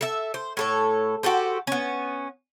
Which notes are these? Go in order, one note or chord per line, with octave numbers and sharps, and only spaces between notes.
A4 E5
C5
A2 A4 C#5
F#4 G4 A4 C5
B3 C#4